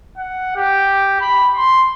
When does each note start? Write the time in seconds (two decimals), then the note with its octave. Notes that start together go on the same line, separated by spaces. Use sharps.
0.18 F#5
0.56 G4
1.21 B5
1.56 C6